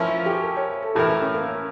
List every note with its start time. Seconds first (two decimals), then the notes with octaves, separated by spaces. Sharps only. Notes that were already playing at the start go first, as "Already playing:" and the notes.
Already playing: F3 C#4 E4 A#4
0.08 F4
0.26 G4
0.42 A#4
0.57 C#5
0.82 A4
0.95 A2 E3 A3 E4 G4 A#4
1.08 C#4
1.22 C#4
1.34 A#3
1.47 C#4